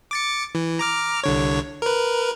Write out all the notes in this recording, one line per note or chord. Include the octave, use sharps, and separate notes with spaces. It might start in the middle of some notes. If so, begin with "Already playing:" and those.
D6 A6 C#7
E3
A#5 D6 F6
C2 D3 C#5
A#4 B4